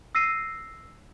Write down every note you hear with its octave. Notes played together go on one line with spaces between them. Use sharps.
E6 A#6 C7 D#7